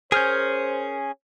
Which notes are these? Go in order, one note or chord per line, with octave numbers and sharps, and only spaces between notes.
C#4 G#4 A#4 C5 F6 G6